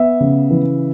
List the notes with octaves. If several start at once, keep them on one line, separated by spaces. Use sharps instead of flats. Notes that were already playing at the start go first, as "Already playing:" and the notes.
Already playing: B3 E5
C#3
E3